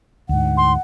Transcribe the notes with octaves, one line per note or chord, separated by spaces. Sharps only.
D2 G#2 F#5
C6